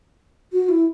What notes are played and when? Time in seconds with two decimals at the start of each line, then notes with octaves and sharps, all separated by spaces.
0.53 F#4
0.69 E4